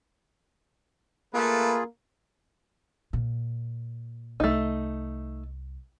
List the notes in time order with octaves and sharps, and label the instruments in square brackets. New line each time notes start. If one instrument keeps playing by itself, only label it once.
[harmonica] A3 B4 [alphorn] A#3 [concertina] F4 G#4
[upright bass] A#2
[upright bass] C2 [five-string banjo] A3 D#4